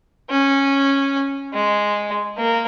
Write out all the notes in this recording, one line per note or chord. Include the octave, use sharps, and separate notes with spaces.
C#4
G#3
A#3